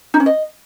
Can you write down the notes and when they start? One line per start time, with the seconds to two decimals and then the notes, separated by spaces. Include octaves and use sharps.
0.14 D#4
0.20 C#4
0.26 D#5